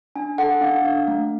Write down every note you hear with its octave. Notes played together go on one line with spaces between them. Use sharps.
D4 G#5
A4 F#5
D4 F5
D4 F5
A3